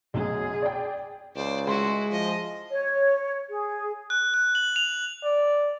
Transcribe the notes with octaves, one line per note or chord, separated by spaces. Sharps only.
B1 F#2 G#4
D5 G5
C#2 C5 D5
G#3 E4 F#4 C6
F3 D#5
C#5
G#4
F#6
F#6
F#7
F7
D5